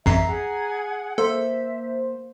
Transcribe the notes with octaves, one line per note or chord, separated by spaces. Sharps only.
A1 F2 E5 A#5 C7
G#4 F#5 G#5
A#3 A4 C5 E5